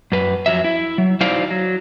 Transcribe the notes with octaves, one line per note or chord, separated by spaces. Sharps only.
F#2 B4
F2 F#3 E5
E4
F#3
F#3 D#4 E4 C5 D5 F5
F#3